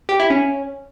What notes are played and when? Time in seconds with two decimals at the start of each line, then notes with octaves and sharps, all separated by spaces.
0.09 G4
0.19 E4
0.30 C#4